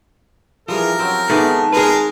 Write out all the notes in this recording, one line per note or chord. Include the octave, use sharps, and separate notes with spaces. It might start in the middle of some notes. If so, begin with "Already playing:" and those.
E3 F3 G3 G#4 A#4
F#3 C4 C#4 F#4 G5
G#2 D#3 A3 B3 G#4 D5 A5
G#3 G#4 A#4 B4